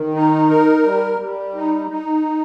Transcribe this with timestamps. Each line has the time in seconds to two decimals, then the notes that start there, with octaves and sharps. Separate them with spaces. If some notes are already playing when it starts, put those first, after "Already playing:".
Already playing: D#3
0.14 D#4
0.49 A#4
0.84 G3
1.19 G3
1.55 D#4
1.89 D#4